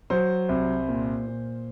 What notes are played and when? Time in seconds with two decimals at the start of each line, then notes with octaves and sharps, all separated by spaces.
0.10 F#3 C5
0.49 C2
0.89 A#2
1.27 A#2